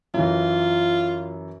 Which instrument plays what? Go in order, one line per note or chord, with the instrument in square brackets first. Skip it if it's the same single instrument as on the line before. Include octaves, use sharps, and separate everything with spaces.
[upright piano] F#2 E3 [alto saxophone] F4